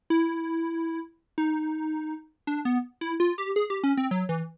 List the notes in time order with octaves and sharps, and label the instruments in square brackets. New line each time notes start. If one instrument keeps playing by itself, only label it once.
[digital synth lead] E4
D#4
D4
B3
E4
F4
G4
G#4
G4
C#4
C4
F#3
E3